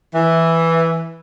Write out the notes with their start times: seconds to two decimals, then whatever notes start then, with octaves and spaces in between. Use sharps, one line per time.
0.15 E3